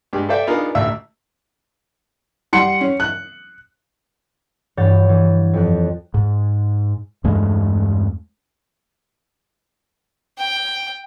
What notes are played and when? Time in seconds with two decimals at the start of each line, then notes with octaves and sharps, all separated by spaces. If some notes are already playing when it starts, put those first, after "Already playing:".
0.13 G2 G#3 G4
0.29 A4 C5 D5 E5 G5
0.47 B3 D4 D#4 F4 G#4 A#4
0.75 A1 D2 E5 E6
2.53 G3 F#5 C6 C#7
2.81 C#4
3.00 F#6
4.77 G2 E3 C#5 F#5 G6 A6
5.09 E3
5.53 F2 F#6
6.14 G#2
7.24 E2 G2 G#3 A3
10.38 G5